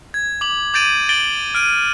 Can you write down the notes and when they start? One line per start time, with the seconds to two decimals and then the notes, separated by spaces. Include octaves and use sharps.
0.14 G#6
0.41 D6 F#7
0.74 D6 G6 A6 D7 D#7 F#7
1.09 A6 D7 F#7 G7
1.55 F6 D7 D#7